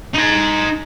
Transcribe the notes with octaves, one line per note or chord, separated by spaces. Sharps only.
D#4 C6